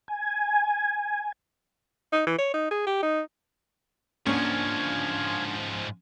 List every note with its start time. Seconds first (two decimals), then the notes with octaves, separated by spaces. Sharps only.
0.08 G#5
2.12 D#4
2.27 E3
2.38 C#5
2.54 D#4
2.71 G#4
2.87 G4
3.02 D#4
4.26 G#2 F3 A#3 C#4 D4 F5 F#5 G#5